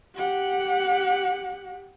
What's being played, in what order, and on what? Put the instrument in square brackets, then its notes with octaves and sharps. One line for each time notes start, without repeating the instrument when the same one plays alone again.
[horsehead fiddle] G4 F#5